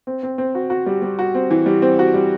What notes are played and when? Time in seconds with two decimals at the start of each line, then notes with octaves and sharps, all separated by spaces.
0.07 C4
0.23 C4
0.38 C4
0.55 F#4
0.70 F#4
0.86 G3
1.02 G3
1.19 F#4
1.35 C4
1.51 E3
1.66 G3
1.82 C4
1.99 F#4
2.14 G3